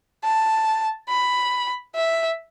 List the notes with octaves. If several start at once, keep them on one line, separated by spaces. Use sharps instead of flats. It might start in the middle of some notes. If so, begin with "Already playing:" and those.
A5
B5
E5